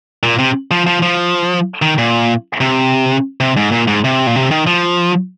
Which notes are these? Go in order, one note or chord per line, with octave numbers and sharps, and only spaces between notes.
A#2
C3
F3
F3
F3
D#3
A#2
C3
C3
G#2
A#2
G#2
C3
A#2
C3
D#3
F3